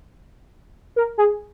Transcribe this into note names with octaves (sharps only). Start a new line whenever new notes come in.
A#4
G#4